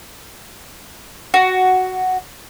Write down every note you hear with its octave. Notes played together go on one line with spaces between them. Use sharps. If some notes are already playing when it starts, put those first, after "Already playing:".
F#4